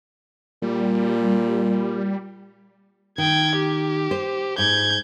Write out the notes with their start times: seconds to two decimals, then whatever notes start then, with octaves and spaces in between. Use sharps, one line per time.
0.62 A#2 G3
3.18 D#3 G5 G#6
3.56 G4
4.11 C5
4.58 G#2 G6 G#6